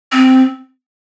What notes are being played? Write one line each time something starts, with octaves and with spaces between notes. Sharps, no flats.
C4